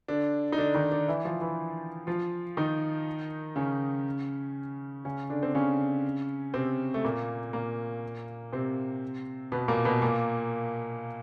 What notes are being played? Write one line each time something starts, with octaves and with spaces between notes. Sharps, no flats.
D3 D4
D#4
D3 D4
D#3 D#4
D3 D4
E3 E4
F3 F4
E3 E4
F3 F4
D#3 D#4
C#3 C#4
C#3 C#4
D3 D4
C4
C#3 C#4
C3 C4
A3
A#2 A#3
A#2 A#3
C3 C4
B2 B3
A#2 A#3
B2 B3
A#2 A#3